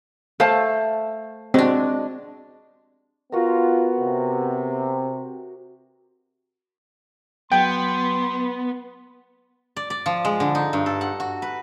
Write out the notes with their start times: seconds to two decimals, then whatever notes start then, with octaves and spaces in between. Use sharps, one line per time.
0.40 A3 C5 F5 A5
1.54 G#3 C4 D4 F#4
3.32 B3 F4 F#4 A#4
3.98 C3
7.52 F#3 B3 G5 C6
9.77 D5
9.90 D5
10.06 F3
10.25 G#3
10.40 D3
10.55 D#4
10.73 G2
10.86 A4
11.01 F#5
11.20 F#4
11.42 B4